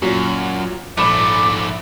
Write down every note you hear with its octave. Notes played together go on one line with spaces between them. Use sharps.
F#2 A#2 F#3
A#1 G#2 A3 B5 D6 E7